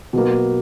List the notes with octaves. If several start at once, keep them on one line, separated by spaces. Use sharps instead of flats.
B2 F#3 A#3